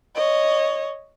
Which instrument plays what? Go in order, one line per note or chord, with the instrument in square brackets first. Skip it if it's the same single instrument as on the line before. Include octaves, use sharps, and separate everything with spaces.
[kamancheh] C#5 D#5